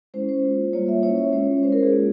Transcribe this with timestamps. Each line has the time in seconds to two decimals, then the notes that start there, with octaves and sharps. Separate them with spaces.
0.14 G#3 C#4 E4 C5
0.29 C5
0.44 A#3 F4
0.73 G3 A#3 F4 C#5
0.88 E5
1.03 G#3 C#4 E4 C#5
1.18 E5
1.33 G#3 C#4 F4 C#5
1.63 G#3 C#4 E4 C5
1.72 A#4
1.83 G#4
1.92 A#3 F4